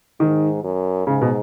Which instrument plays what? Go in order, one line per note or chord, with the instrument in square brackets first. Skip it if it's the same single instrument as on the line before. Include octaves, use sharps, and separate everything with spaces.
[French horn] G#2 [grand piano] D#3
[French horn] F#2
[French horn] G#2 [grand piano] C#3
[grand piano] B2